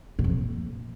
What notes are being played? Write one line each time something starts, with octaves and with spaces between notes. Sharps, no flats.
A#2
F2
A#2